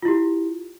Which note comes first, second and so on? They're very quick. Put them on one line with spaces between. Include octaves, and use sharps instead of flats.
F4 E4 G4